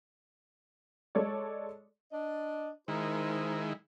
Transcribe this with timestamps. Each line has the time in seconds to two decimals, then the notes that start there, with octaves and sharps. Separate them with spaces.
1.15 G#3 A4 C#5 D5
2.12 D4 D#5
2.88 D#3 G#3 D#4 E4 A#4 C5